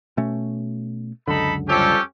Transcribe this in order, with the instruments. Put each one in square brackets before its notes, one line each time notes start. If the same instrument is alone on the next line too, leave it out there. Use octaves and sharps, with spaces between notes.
[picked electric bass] B2 A3 C#4
[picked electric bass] C#2 F#2 D3 [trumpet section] D#4 A4 B5
[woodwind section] F2 G3 A4 [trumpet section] C#4 G4